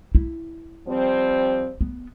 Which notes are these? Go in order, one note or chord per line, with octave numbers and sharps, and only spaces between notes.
E4
F3 G3 C4
B3